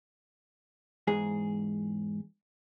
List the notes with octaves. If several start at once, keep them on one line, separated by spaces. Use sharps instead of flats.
E2 G#2 G#4